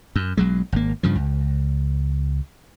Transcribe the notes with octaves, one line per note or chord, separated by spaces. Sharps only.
F#2
B1 F#3 G#3
G#1 A#3
G2 C#3 F3
C#2